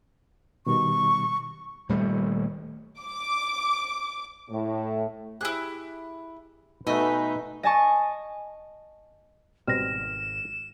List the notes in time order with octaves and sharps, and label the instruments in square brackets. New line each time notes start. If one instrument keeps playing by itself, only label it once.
[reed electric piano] B2 D#3 G3 [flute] C#6
[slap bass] D#1 G3 A3
[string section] D6
[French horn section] A2
[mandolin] E4 F#6 [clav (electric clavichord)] G4 G#4
[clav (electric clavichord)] B2 A3 [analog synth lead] D#4 [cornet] B4 [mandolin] D#5 E5 G#5
[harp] D#5 G#5 A5 C#6
[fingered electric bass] G#1 [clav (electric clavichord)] B2 G3 C4 [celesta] F6 A#6 [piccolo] E7